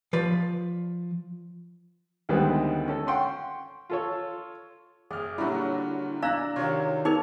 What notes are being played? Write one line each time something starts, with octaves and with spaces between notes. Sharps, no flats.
F3 B4 D5
D2 D#3 G3 G#3 B3 C4
C#4 A4
F#5 G5 C6 C#6
F4 A4 C#5
F#1 G#4 D5 F6
A#2 D3 F#3 G3 E4 F#4
D4 D5 F5 A#5 E6 F#6 A#6
C3 D#3 F#3 F4 C#5
D#4 G#4 A#4 G#6 F7